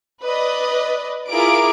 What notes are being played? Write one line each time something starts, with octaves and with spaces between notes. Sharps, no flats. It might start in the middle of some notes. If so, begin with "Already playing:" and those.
B4 D5 D#5
E4 F4 G#4 A#4 D6 D7